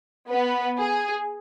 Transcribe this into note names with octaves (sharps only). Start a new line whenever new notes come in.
B3 B4
G#4